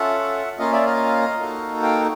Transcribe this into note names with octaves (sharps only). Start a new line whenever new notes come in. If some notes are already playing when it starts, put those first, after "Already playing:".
Already playing: C#4 F4 A4 E5 F#5
A#3 C#4 F4 D#5 F5
D5 E5
D#5 F5
A#3 D#4 F#4 A4
F5 G5